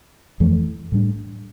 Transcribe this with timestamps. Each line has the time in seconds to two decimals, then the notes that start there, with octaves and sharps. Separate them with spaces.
0.40 F2 E3 A3
0.92 A2 G3 D4